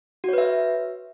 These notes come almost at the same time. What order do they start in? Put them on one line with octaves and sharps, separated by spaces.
F#4 C#5 B4 E5